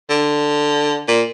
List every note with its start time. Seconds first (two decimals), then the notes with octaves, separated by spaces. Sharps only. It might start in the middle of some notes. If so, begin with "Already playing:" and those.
0.10 D3
1.08 A#2